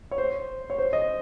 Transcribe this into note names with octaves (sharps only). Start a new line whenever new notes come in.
C#5
C5
C#5
C5
D#5